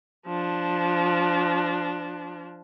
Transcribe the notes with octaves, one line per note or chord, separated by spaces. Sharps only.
F3 D4